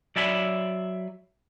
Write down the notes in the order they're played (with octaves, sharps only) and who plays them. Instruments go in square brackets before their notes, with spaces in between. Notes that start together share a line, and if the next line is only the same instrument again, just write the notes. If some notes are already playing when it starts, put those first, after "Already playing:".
[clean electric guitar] F#3 D5 E5 G#5 B5